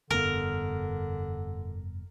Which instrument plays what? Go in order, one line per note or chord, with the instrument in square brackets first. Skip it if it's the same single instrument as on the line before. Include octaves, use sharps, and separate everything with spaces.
[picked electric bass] F1 G2 B3 [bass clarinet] D3 [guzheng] A#4